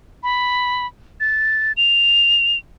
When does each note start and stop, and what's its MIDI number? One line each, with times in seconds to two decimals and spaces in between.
0.23 0.86 83
1.20 1.72 93
1.77 2.57 101